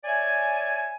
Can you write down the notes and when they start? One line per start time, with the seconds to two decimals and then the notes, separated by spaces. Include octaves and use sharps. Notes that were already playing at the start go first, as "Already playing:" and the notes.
0.04 C#5 D5 E5 G#5